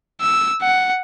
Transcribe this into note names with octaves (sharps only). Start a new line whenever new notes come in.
E6
F#5